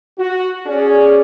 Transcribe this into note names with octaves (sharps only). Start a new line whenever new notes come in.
F#4
C#4 G#4 D5